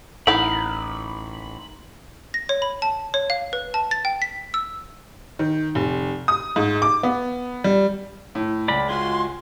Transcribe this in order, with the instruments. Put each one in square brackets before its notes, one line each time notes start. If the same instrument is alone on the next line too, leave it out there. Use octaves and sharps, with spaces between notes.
[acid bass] A1 [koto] D#4 A#4 F5 [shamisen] E4 F#5 [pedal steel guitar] B5
[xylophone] A#6
C#5
B5
A5
C#5
F5
B4
A5
A6
G5
B6
E6
[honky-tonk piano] D#3
F1
D#6
G#2
D6
B3
G3
[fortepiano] A2
[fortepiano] C#2 [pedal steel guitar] D5 B5
[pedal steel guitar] G#3 F4 F#4 [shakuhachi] C6